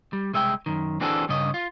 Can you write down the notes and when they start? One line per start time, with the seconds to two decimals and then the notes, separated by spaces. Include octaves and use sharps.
0.13 G3
0.33 C2 G#3 E5 F5 G5
0.66 F#2 D#3
1.01 E3 C4 D4 F#4 G#4 A4
1.29 G2 C#3 C#4 D#5
1.54 F4